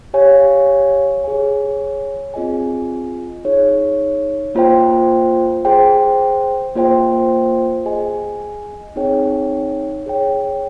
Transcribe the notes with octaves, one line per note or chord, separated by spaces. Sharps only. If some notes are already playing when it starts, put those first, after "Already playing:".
G4 C#5 F5 G#5
G#4 C#5 G#5
C4 F4 G#4 D#5 G#5
D#4 G#4 C#5
A#3 F4 C5 G5
G#4 C5 G5
A#3 F4 C5 G5
G#4 D#5 G#5
C4 D#4 G#4 C#5 G5
G#4 C#5 G5